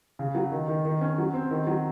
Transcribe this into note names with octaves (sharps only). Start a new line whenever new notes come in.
C#3
F#3
D#3
D#3
D#3
C#4
F#3
C4
D#3
F#3